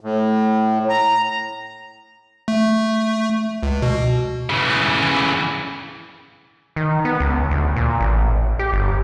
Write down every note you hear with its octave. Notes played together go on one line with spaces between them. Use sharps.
A2
A#5
A3
C#2
B2
C#3 E3
D#3
B3
C#2
D2
A#2
A1
G4
G1